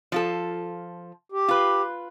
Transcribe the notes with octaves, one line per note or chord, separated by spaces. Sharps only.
F3 F4 A4
G4
F4 B4